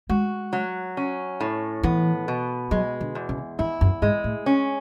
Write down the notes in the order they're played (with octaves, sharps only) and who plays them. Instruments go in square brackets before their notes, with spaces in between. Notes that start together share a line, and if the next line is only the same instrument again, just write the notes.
[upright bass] G#3 [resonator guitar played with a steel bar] F#4
[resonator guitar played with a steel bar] F#3
C#4
A2
[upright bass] E3 [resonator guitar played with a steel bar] B3
[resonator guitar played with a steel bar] B2
[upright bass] F#3 [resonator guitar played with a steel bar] G#3
[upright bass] D3
[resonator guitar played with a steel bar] E2
[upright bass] C#3
[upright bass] E3 [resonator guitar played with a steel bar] E4
[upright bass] F#2
[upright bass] G#2 [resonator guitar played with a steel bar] G#3
[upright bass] A2
[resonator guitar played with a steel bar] C#4